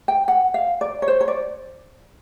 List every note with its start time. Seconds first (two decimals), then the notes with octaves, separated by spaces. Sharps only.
0.08 G5
0.28 F#5
0.54 F5
0.81 D5
1.02 C#5
1.08 C5
1.21 C#5
1.28 D5